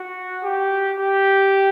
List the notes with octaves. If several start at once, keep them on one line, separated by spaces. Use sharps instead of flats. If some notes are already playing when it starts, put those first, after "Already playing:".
Already playing: F#4
G4
G4